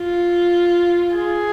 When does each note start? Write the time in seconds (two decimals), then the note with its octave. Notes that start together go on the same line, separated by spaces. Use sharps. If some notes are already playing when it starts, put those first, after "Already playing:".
Already playing: F4
1.16 G#4